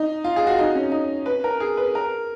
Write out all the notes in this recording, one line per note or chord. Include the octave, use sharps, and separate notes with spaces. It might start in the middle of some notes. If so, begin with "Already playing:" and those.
Already playing: D#4
F4
G#4
F#4
D#4
C#4
D#4
B4
A#4
G#4
B4
A#4